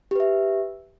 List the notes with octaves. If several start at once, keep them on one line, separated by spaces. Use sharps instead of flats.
G4 B4 E5